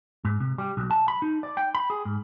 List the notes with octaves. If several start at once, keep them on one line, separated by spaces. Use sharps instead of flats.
G#2
C3
G3
B1
A5
B5
D#4
D5
G5
B5
G#4
G#2